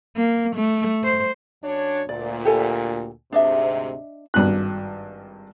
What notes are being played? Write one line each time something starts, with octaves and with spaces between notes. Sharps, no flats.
A#3
A3
C5
F#2 D4 C#5
D2 A#2 D5
G4 A4 G#5
D2 G#2 C3 D4 D#5 E5
G#1 G2 F#6